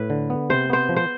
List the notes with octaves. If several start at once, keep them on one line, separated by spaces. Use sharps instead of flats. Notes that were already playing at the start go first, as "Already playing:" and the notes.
Already playing: A2 B4
D3
B3
C3 C5
B3 C5
F3
C5